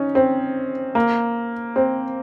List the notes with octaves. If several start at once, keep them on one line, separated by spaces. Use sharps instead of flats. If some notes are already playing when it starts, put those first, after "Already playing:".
Already playing: C#4 D#4
C4
A#3
C4